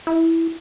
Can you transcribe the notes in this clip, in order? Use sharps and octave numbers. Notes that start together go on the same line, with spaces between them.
E4